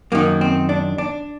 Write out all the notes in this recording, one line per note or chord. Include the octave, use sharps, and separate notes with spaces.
F#2 D#3 A#3
C4
D4
D4